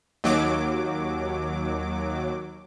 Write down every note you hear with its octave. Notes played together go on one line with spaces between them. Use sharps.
D#2 F#3 D6